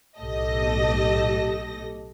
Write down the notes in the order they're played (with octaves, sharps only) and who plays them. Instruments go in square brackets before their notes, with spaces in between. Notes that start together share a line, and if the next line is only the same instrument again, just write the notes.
[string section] B1 A2 G4 A4 D#5 A#6